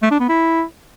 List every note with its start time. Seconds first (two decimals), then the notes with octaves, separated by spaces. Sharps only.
0.02 A3
0.11 D4
0.20 B3
0.29 E4